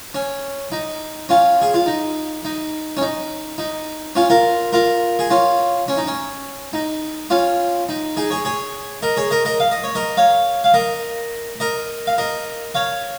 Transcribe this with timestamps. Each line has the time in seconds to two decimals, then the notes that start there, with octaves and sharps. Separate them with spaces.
0.14 C#4
0.72 D#4
1.29 C#4 F4
1.62 G#4
1.74 F4
1.86 D#4
2.45 D#4
2.97 C#4
3.02 D#4
3.58 D#4
4.15 C#4 F4
4.30 F4 A#4
4.73 F4 A#4
5.19 G#4
5.30 C#4 F4
5.88 C#4
5.97 D#4
6.07 C#4
6.73 D#4
7.30 C#4 F4
7.89 D#4
8.17 D#4 G#4
8.31 G#4 C#5
8.45 G#4 C#5
9.02 A#4 D#5
9.17 G#4 C#5
9.31 A#4 D#5
9.45 A#4 D#5
9.60 F5
9.71 D#5
9.84 C#5
9.95 A#4 D#5
10.17 C#5 F5
10.64 F5
10.74 A#4 D#5
11.60 A#4 D#5
12.07 F5
12.18 A#4 D#5
12.75 C#5 F5